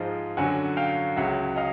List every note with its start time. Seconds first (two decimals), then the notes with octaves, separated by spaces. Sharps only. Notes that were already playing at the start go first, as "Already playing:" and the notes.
Already playing: G#2 F3 G#3 D#5 F5
0.37 F#2 D3 F#3 F#5 G#5
0.77 F5 G5
1.17 C#2 C#3 F#3 E5 F#5
1.56 D#5 F5